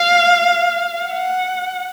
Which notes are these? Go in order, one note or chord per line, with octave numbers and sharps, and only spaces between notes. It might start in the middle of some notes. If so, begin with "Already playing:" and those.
Already playing: F5
F#5